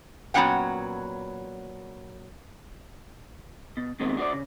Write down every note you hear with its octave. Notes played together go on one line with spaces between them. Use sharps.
A#2 F#3 B3 C#4 F#5 G5
B2
D#2 G#2 B2 D#3 G#3 C4
D4 F#4 A#4 C5 D5
C#3